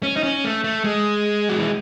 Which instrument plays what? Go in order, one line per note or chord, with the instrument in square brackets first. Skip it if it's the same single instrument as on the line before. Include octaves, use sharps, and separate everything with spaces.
[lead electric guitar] C#4
D#4
C#4
A3
A3
G#3
F#3
E3